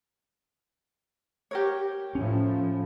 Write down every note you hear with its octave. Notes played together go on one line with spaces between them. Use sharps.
G4 A#4 C#5
A2 F3 C#4